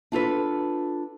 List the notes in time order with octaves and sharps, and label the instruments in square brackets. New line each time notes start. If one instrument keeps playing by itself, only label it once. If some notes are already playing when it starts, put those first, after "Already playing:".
[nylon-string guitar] D4 F4 A4 B4